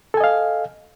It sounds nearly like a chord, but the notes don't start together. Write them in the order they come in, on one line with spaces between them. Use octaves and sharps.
A4 G#5 D#5 F5